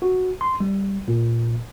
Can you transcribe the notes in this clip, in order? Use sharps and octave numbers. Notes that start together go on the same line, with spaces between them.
F#4
C6
G3
A#2